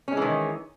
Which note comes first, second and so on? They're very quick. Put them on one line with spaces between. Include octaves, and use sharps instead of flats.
C#4 G#3 E3 D#3